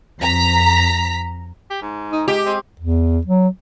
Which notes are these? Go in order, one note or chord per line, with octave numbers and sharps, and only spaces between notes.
F2 A#5 B6
G4
G#2
D#4
G#3 G4
G#3 C4
E2
F#3